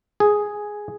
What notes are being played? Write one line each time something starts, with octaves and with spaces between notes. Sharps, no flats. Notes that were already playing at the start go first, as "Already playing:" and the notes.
G#4